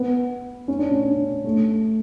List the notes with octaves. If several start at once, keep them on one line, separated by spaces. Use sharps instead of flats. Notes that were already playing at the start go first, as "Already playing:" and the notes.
Already playing: B3
C#4
D4
C#4
A3